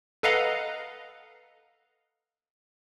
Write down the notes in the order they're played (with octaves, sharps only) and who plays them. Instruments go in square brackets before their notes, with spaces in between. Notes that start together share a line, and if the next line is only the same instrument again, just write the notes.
[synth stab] A4 B4 D#5 F5 F#5 A#5